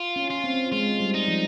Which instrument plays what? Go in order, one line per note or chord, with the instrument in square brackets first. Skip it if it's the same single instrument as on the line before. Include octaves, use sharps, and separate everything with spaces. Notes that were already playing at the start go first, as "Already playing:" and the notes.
Already playing: [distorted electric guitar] F4
[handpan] C#4
[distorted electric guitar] F4
[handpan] C4
[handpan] G#3 [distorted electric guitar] F4
[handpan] G3
[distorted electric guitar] D#4
[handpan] F3